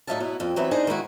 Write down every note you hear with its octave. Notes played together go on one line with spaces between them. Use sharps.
A2 F#3 D#4 E5 F5 A5
B2 F#3 B3 E4
F2 C4
E3 F#3 B3 C4 E4 E5
D4 D#4 G#4 C5
D#3 G#3 E4 F#4